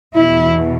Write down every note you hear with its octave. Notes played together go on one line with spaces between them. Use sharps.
E2 B2 E4